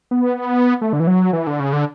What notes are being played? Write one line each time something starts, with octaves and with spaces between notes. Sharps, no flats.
B3
A3
D3
E3
F#3
E3
D3
C#3
D3